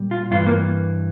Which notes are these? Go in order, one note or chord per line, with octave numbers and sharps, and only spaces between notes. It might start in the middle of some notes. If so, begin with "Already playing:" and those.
Already playing: A#2 G3
F4
G2 E3 F4
A#3